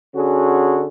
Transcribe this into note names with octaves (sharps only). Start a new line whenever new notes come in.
D3 C#4 F#4 G#4